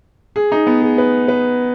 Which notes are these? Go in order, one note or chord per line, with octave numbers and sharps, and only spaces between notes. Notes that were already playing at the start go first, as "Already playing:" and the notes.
G#4
D#4
B3
G#4
B4
B4